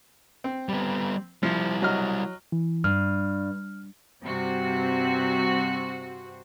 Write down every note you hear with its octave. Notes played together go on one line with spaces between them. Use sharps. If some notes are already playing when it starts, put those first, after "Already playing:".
C4
G3 B3
F3 G3 E4
F#3 D#5 F6
E3
G2 F6
G2 C3 C4 F#4